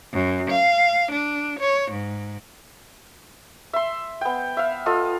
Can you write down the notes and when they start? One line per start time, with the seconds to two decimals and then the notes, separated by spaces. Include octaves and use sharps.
0.13 F#2
0.50 F5
1.12 D4
1.60 C#5
1.92 G#2
3.73 E5 C6
4.21 B3 G5
4.57 E5 F5
4.86 F4 A4 D#5